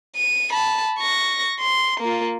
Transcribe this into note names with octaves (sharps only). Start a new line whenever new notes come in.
D#7
A5 B5
C#6 A#6
C6
A#3 F4